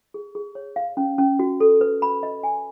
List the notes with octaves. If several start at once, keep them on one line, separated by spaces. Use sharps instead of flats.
G#4
G#4
C#5
F5
C#4
C#4
F#4
A4
B4
B5
D#5
G#5